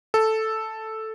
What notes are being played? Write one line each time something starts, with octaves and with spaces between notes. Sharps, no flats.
A4